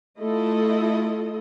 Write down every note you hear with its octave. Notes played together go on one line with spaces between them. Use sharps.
A3 E4 F4 A4 D#5